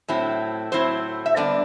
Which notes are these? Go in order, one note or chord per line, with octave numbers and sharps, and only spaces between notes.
A2 F#3 C4 E4
A2 F#3 C4 E4 C5
E5
D3 G3 B3 D4 D5